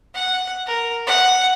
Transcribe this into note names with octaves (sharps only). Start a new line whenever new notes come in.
F#5
A#4
F#5